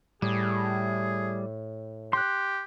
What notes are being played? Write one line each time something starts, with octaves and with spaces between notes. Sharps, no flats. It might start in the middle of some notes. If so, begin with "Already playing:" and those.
A2 G3 G#4
G4 C6 F#6